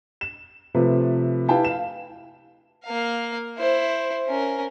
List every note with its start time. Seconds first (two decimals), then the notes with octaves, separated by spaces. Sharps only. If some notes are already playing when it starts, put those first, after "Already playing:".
0.21 E7
0.74 C3 F3 A3 F4 B4
1.49 E4 G4 B4 F5 G5 A5
1.65 F5 E7
2.85 A#3 F5
3.58 E4 C5
4.28 C#4 A#4